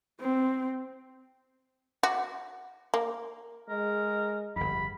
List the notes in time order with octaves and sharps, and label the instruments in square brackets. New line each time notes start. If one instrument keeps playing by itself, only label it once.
[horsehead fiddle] C4
[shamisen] F#4
A#3
[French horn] G#3 [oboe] A#4
[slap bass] G1 F2 [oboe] B5